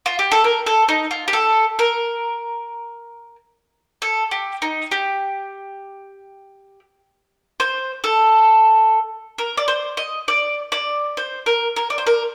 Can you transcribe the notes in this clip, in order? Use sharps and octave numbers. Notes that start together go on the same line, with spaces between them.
F4
G4
A4
A#4
A4
D#4
F4
G4
A4
A#4
A4
G4
D#4
G4
C5
A4
A#4
D5
C5
D#5
D5
D5
C5
A#4
A#4
D5
C5
A#4